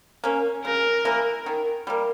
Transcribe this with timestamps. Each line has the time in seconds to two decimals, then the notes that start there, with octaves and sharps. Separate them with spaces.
0.24 A#3 C#4
0.65 C#3 A#4
1.05 E3 A#3
1.46 D#3
1.87 G3 A#3